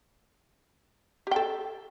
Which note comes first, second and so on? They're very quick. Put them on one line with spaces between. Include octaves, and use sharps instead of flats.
G4 G5 A4